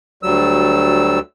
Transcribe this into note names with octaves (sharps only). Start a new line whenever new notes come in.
D2 F#3 G3 E6